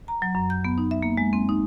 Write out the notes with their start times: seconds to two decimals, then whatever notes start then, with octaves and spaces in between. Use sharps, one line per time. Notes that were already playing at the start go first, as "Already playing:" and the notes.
0.08 A#5
0.22 F#3
0.35 F#2
0.50 G6
0.65 B3
0.78 D#4
0.91 E5
1.03 A#3
1.17 G#3
1.33 C4
1.49 D#4